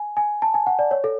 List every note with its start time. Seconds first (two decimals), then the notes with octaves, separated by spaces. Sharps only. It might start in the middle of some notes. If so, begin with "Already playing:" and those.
Already playing: G#5
0.17 G#5
0.42 A5
0.54 G#5
0.67 F#5
0.79 D5
0.91 C#5
1.04 A4